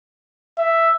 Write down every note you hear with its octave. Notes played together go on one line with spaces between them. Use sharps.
E5